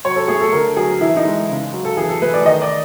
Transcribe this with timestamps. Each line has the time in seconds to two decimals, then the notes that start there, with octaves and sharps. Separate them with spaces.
0.05 F#3 C#5
0.16 A4
0.28 A3 G#4
0.41 A4
0.52 D3 A#4
0.77 F#3 G#4
1.01 E3 E4
1.17 D#4
1.25 G#3
1.49 C#3
1.73 F#3
1.85 A4
1.97 E3 G#4
2.09 A4
2.22 A3 B4
2.34 D5
2.45 D#3 D#5
2.62 D5